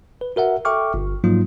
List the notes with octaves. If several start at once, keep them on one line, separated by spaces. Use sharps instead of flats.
B4
F#4 A#4 E5 F#5
A4 E5 G5 C#6 D6 F6
G1
G#2 F3 F#3 A#3 D#4 F4